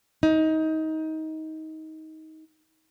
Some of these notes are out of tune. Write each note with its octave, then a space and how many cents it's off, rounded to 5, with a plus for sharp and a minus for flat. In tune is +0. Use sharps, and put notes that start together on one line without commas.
D#4 +20